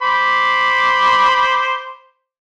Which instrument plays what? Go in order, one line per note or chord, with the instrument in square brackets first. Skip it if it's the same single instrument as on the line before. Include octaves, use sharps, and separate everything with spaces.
[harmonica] C5 B5 D6